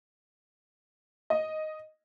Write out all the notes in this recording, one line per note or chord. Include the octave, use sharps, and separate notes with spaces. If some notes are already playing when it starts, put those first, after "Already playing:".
D#5